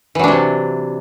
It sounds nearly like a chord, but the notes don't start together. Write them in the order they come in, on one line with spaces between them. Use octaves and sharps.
E3 F#3 D4 C3